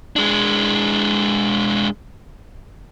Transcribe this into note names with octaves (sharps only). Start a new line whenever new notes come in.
G#3 D4